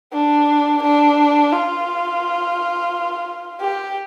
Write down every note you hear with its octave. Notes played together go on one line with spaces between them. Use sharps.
D4
D4
F4
G4